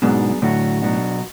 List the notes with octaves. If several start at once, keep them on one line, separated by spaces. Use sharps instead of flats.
G#2 B2 F#3 B3 D4 G#4
A2 D3 F#3 A3 D4 F#4
B2 F#3 B3 D4 F#4